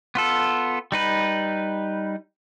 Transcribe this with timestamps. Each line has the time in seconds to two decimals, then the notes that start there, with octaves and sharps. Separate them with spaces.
0.15 B3 F4 A4
0.92 G3 D#4 B4